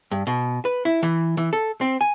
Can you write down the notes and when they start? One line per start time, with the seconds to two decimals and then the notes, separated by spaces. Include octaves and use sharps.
0.11 G2
0.27 B2
0.65 B4
0.85 E4
1.03 E3
1.37 E3
1.53 A4
1.81 C4
2.01 G#5